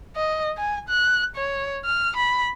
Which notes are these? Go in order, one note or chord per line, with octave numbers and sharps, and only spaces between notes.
D#5
G#5
F#6
C#5
F6
B5